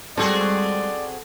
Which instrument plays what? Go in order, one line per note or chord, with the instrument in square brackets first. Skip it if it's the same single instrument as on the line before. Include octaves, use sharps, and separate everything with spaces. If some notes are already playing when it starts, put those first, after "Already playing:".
[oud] G3 G#3 [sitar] C4 F#4 G#4 [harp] A4 [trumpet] D5